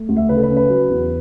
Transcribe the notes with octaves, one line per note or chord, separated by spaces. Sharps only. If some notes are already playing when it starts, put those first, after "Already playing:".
Already playing: A3
D2
E5
C#3 B4
A4
B4
C#4
B4
F#3
E2